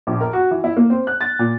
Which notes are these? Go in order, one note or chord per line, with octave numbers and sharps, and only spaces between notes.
A#1
A#4
F#4
E3
E4
A#3
C4
F#6
A6
A#2